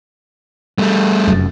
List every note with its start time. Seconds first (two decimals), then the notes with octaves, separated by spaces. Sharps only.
0.78 G3 A3
1.27 F1 F#2